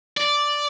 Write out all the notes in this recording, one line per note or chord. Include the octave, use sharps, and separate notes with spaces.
D5